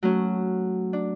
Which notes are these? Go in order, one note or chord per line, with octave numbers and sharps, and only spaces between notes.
F#3 A3 C#4
D4